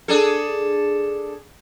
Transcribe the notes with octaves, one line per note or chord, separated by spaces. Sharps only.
D4 G#4 A4